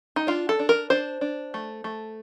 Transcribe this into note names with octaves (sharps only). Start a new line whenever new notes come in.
D#4
D4 F4
A4
D4
A#4
D4 C5
D4
A3
A3